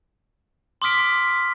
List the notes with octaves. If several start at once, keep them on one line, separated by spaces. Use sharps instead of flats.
C6 D6 D#6 F6 B6 D7